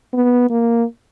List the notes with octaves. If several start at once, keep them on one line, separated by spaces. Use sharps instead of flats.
B3
A#3